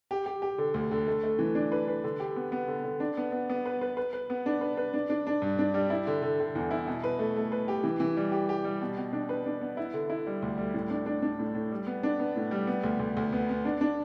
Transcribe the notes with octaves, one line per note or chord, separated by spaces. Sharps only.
G4
G4
G4
D3
D2
D3
A3
A3
E3
D4
B4
B4
D3
G4
B3
B3
D3
D3
D4
B3
B3
B3
B4
B4
B4
B4
B3
D4
B4
B4
D4
D4
D4
G2
D4
G3
E4
D3
D3
D3
E2
E4
B2
B4
A3
A3
B4
G4
E3
E3
G3
G4
G4
G3
B2
B2
D4
B4
D4
B3
E4
D3
E4
G3
D2
G3
A2
D4
D4
D4
A2
A2
G3
B3
D4
B3
A2
G3
B3
D2
D2
D2
B3
B3
D4
D4